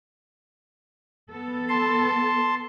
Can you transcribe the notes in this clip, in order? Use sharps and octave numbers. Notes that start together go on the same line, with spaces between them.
B3 A4
A5 C6